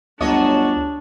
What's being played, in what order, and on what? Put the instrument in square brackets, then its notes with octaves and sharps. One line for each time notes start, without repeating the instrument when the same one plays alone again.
[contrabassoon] G1 [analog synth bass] D2 [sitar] F#3 C#5 D#5 [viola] D4